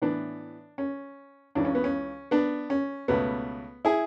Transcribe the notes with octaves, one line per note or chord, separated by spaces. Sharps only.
A2 E3 B3 D4
C#4
C#2 C#3 E3 D4
C#4
B3
C#4
B3 D4
C#4
C#2 B2 A3 B3
E4 G#4